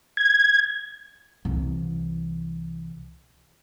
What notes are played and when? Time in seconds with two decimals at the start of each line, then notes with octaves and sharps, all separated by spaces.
0.17 G#6
1.45 C2 E3